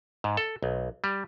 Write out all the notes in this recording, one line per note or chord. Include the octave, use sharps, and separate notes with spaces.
G#2
A4
B1
G3